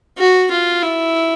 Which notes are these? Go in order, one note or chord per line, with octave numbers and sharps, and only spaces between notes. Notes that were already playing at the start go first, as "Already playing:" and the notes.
F#4
F4
E4